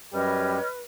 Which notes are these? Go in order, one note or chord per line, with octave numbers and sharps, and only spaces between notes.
F#2 G3 G4 B4 C#5 D#5 F6